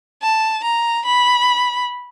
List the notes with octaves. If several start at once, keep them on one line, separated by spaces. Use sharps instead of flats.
A5
A#5
B5